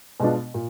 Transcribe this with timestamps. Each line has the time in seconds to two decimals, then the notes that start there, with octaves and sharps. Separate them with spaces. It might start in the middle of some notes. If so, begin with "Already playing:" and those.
0.20 B2 G#3 B3 D4 F4
0.54 A#2